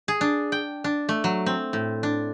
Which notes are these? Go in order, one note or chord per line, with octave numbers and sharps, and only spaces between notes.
G#4
D4
G5
D4
A3
F#3
C4
A2
D4